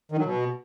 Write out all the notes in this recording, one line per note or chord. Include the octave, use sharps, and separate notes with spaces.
D#3
F#3
B2